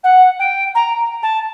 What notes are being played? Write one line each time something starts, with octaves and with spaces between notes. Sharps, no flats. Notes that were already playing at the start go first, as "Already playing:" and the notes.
F#5
G5
A#5
A5